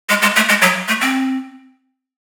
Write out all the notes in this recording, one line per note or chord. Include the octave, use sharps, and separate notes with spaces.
G#3
G#3
A3
G#3
F#3
A3
C4